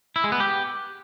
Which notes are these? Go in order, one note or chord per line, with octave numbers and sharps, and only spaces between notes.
E4
G#3
B3
G4